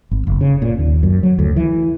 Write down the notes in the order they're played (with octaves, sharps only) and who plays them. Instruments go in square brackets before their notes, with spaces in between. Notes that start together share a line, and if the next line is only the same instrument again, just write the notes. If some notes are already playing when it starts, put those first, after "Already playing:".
[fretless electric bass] G#1
F#1
C#3
A#2
D#2
F#2
F#3
D2
E3